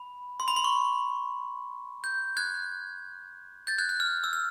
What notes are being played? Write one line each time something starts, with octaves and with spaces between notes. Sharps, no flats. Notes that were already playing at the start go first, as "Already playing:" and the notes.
Already playing: B5
C6
B5
C6
C#6
G6
F#6 G#6
G6 A6
F#6 G#6
F#6
F6
E6
F6